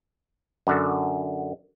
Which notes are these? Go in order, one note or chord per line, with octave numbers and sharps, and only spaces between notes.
F#2 D3 F#4